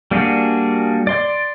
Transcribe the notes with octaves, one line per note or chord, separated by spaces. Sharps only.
G3 A#3 D4 F#4 G#4
D5 C6